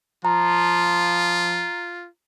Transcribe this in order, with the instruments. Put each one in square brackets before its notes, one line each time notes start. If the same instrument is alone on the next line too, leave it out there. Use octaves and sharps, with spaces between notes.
[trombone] F3 [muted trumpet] F4 [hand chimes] A#5